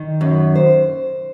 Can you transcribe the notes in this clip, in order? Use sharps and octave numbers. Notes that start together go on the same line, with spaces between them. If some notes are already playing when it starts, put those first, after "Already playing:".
Already playing: D#3
F#2
C5